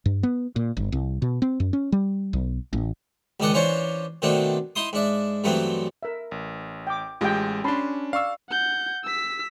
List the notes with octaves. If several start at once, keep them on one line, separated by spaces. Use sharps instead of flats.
G2
B3
A#2
G1
C2
B2
C4
F#2
C#4
G3
B1
A1
C#2 G#2 D#3 D5 D#5 F#5
E3 C#4 D4 F4 C5 C#5
B2 D#3 A3 C4 D4
D#4 E4 C6 D#6
G#2 D4 E5
G2 E3 F#3 A3 B3 C4
A#4 E5
A1
G5 D6
A1 G#3 F4 G4 G5
C#4 D4 A5 B5 C6
D5 F5 C#6 E6
F#5 G6
E6 B6